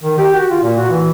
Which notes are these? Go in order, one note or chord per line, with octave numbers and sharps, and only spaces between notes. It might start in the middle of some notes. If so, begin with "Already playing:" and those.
D#3
G4
F#4
F4
A#2
F#4
E3